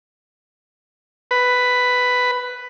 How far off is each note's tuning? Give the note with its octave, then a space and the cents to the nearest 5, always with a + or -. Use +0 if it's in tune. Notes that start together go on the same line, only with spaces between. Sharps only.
B4 +10